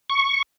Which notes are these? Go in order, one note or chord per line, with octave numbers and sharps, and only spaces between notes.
C#6